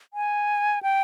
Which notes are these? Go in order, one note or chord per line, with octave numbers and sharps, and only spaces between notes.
G#5
G5